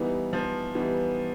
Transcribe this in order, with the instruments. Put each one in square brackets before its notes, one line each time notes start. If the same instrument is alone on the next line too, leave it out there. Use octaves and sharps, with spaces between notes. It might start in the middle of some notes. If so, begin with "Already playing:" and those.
Already playing: [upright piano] E3 [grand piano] G3 B3 D#4
[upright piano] F3
[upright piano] E3 [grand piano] G3 B3 D#4